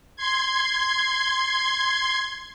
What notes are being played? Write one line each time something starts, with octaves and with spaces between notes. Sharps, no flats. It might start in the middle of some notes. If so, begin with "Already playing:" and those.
C6 G#6